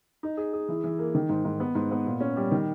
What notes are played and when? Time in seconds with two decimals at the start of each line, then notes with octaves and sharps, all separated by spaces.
0.23 D#4
0.37 G#4
0.53 G#4
0.69 E3
0.84 E3
0.99 A#3
1.15 D#3
1.29 G#2
1.45 G#2
1.60 B3
1.75 G#2
1.91 B3
2.06 A#2
2.20 C#4
2.36 G3
2.52 D#3